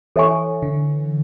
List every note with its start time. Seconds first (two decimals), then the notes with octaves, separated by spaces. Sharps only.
0.16 E3 A4 C#5 E5 G#5 C#6
0.62 D3